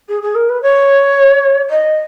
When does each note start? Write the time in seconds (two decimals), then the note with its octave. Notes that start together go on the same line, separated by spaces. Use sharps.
0.08 G#4
0.21 G#4
0.34 A#4
0.49 B4
0.62 C#5
1.69 D#5